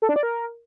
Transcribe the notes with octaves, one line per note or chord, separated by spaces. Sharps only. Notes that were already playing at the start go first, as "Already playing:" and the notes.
A4
D4
D5
A#4